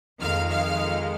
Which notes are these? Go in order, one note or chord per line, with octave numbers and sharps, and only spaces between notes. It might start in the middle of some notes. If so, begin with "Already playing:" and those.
F2 D#3 G#3 F5 F6
F5 F6